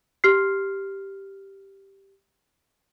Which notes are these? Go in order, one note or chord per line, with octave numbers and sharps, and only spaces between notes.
G4 F6 C7